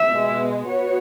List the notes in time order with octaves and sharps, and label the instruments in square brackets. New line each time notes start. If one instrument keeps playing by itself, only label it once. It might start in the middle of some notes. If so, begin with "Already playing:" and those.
Already playing: [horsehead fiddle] E5
[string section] B2 G#3 B3
B3 F#4 C#5